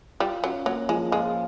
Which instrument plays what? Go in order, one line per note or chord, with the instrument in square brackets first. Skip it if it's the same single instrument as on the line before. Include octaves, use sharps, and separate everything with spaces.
[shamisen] G3 [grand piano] F4
[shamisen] F#3 [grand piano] C#4
[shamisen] F#3 [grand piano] A#3
[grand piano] F3 [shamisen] G#3
[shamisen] G#3 [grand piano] F4